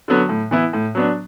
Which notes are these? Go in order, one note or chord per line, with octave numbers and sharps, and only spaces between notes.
D3 F#3 B3
A2
E3 B3 E4
A2
F#3 B3 D4